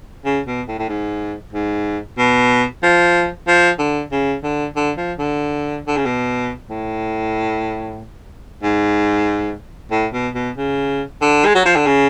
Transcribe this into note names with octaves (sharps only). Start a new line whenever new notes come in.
C#3
B2
A2
A2
G#2
G#2
B2
F3
F3
D3
C#3
D3
D3
F3
D3
D3
C#3
B2
A2
G#2
A2
B2
B2
C#3
D3
G#3
F#3
F3
D3
C#3